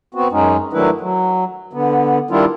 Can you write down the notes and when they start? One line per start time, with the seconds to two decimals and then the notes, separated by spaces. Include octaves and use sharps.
0.14 B3 C4 F#4
0.32 F#2 G#3 C#4 D#4
0.73 D#3 F#3 A3 D4 E4 B4
1.01 F#3
1.73 D3 B3
2.31 D#3 G3 D4 E4 F4